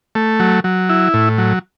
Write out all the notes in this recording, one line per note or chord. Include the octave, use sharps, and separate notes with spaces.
A3
F#3
F#3
E4
A2
F#3